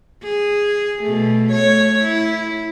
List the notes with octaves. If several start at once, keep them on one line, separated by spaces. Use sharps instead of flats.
G#4
B2 A3
A3 C#5
E4